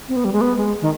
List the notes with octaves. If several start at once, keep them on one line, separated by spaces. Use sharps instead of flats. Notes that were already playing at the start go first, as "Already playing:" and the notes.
C4
B3
G3
G#3
B3
G#3
D#3